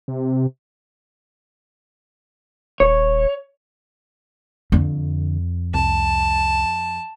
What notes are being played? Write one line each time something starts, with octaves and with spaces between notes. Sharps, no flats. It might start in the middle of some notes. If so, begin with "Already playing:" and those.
C3
D#1 C#5
F2 D3
C2 A5